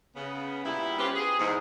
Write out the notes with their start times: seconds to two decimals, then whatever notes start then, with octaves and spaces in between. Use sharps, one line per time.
0.16 C#3 B3
0.64 A#2 G3 B3 E4
0.98 B3 C#4 F4 G4 B4 C5
1.15 G#4
1.39 E2 G#2